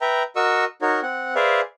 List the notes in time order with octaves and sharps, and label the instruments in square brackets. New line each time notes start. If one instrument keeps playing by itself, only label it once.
[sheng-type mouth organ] B4 E5 G5 A#5
F#4 A#4 D#5 C#6 E6
D#4 F#4 A#4 C#5
C4 F#5
G#4 B4 C5 D5 E5 F5